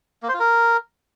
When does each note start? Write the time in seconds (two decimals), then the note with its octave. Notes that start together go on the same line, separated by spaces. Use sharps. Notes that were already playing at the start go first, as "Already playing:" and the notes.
0.23 A#3
0.28 C5
0.34 F4
0.40 A#4